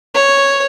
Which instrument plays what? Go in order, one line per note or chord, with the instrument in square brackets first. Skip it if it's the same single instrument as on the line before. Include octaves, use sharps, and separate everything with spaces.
[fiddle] C#5